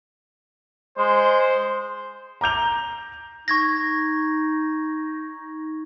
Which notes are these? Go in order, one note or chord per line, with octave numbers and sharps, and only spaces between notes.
G#3 C5
A#5 D6 G6 F7
D#4 C#6 G#6 A#6